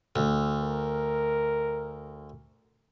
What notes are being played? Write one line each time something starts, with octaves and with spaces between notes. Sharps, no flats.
D2
A#4